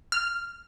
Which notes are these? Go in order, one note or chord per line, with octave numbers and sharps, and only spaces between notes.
F6